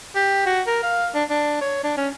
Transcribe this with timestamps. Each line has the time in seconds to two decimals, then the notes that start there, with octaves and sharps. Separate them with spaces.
0.15 G4
0.46 F#4
0.67 A#4
0.83 F5
1.15 D4
1.30 D4
1.61 C#5
1.84 D4
1.97 C#4